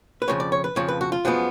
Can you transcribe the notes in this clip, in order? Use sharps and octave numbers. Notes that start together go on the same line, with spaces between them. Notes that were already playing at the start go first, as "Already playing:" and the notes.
B4
F2 C#3 F3 C#5
D5
C#5
B4
F2 C#3 F3 C#5
B4
F#4
F4
F#2 F3 G#3 B3